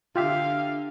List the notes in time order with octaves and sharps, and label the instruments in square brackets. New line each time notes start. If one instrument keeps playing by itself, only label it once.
[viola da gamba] D3 [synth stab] F4 G4 E5 [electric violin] F5